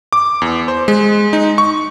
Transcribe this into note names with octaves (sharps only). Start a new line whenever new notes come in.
D6
E2
C5
G#3
D#4
C#6